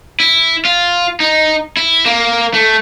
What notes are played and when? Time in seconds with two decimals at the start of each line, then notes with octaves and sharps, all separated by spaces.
0.20 E4
0.65 F4
1.20 D#4
1.77 E4
2.06 A#3
2.54 A3